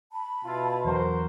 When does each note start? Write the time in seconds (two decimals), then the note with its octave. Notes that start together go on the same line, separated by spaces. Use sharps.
0.12 A5 B5
0.45 B2 E4 F4
0.85 E2 F#3 D4 F#4 A#4 C5